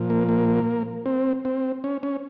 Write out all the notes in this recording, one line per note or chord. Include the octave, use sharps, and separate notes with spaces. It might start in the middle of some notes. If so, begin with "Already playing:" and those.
Already playing: A#2 F3
A#3
A#3
C4
C4
C#4
C#4